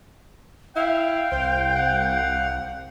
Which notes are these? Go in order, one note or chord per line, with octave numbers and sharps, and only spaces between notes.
E4 F5 G5
C2 C5
F#5